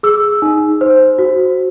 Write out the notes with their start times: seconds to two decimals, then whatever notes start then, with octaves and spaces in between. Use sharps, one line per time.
0.03 G#4 E6
0.42 D#4
0.81 C5
1.19 F#4